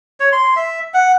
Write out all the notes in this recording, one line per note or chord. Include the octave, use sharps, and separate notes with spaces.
C#5
C6
E5
F#5